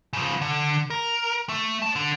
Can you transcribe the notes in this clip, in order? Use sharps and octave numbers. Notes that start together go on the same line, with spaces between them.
C#3 F3
D3
A#4
A3
C#5 A5
D3